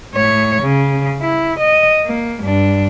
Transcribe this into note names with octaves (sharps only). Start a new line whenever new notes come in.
A2 C#5
C#3
E4
D#5
A#3
G2 D4